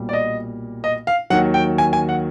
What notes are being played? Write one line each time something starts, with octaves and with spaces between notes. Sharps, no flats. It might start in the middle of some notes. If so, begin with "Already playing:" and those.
Already playing: B1 A#2 G3
D5
D#5
D#5
F5
D#2 D#3 F#3 F#5
G5
G#5
G#5
F#5